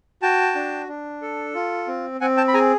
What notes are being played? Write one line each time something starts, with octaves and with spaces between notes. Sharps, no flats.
F#4 G5 A5
D4
D4
A4
F4
C4
C4 F#5 G#5
G5 A5
B5
G#4 G#5 A#5